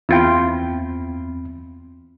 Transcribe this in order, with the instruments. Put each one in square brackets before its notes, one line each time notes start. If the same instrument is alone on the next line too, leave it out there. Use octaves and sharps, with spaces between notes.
[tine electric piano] E2 C4 B5 [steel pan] E4 F4 G5